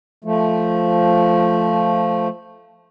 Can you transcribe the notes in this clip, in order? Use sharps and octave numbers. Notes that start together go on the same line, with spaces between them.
F3 A3